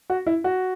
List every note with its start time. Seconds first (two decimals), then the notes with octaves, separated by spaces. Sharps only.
0.10 F#4
0.27 E4
0.44 F#4